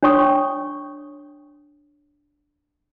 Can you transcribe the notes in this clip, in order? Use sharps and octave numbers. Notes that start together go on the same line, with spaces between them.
D4 C#5 G5 C#6 D#6